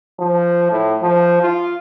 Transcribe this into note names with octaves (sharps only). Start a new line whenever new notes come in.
F3
A2
F3
F4